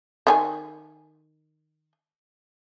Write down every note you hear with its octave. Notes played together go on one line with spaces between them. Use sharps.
D#3 G#4 G#5